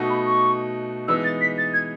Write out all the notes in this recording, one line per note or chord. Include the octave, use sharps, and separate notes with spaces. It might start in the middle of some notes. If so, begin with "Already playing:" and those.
Already playing: B2 A3 D#4 F#4
B5
C#6
E3 G#3 B3 D#4 E6
A6
B6
A6
G#6